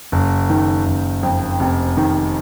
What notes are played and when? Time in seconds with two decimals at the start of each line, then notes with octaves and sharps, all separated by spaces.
0.12 F#1
0.50 D#3
0.86 F#1
1.23 F2
1.60 F1
1.97 D#3